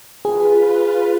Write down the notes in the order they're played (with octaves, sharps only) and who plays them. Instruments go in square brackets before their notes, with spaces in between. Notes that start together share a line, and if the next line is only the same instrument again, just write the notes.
[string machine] F4 B4 [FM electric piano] G#4